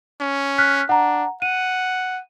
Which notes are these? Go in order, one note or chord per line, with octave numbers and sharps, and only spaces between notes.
C#4
F6 F#6 B6
D4 F#5 A#5
F#5 D#7